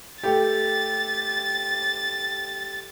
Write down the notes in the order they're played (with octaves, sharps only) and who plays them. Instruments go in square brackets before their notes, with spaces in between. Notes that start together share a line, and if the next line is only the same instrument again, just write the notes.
[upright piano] A3 G4 [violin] A6